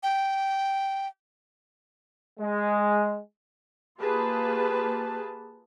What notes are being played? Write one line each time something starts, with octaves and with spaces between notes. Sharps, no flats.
G5
G#3
A#3 F4 G4 G#4 B4 A5